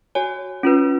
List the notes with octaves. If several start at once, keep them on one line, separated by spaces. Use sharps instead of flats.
F#4 C#5 G#5
C#4 F4 B4